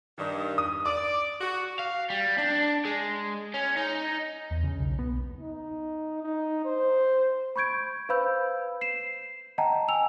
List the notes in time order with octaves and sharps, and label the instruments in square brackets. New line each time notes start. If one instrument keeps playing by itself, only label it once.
[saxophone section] G2 D#3
[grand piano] D#6
[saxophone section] D5 [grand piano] D6
[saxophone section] F#4
[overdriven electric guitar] F5
G3
D4
G#3
C#4
D#4
[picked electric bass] E2
C#3
B1
B3
[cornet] D#4
D#4
C5
[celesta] B5 C#6 G6 G#6 D7
B4 C5 F5 B5 E6 G6
C7 E7
D#5 F#5 G5 A5 A#5
G#5 E6 F7